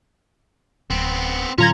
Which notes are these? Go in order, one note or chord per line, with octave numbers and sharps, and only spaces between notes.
D1 B3 C4
A2 D3 F#3 C#4 F4 A#5 G#6